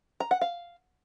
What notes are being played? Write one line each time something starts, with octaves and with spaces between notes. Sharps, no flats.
A#5
F#5
F5